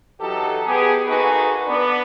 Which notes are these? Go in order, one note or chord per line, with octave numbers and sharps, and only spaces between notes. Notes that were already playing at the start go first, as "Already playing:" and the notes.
E3 F#3 D#4 G4 A4
B3 G4 G#4
A#3 D#4 F#4 G#4 A4 B4
B3 D4